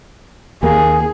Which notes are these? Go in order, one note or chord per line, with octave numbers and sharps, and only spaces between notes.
D#2 A#3 G#4